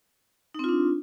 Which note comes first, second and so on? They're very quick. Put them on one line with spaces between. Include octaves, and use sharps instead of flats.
D#4 C4 F4 D4